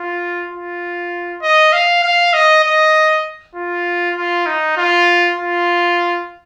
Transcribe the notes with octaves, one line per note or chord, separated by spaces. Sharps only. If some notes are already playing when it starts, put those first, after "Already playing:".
Already playing: F4
F4
D#5
F5
F5
D#5
D#5
F4
F4
D#4
F4
F4